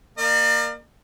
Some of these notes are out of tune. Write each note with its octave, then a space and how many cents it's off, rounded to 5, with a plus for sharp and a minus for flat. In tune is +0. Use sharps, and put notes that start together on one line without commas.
A#3 +0 D5 +40